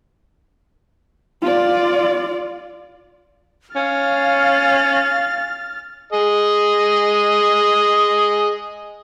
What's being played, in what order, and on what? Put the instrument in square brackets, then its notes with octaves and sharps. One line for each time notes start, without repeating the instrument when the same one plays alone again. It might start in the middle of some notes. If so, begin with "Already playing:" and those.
[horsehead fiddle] F4 D5
[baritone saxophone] C#4 [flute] F5 [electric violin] F6 A6
[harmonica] G#4 D#5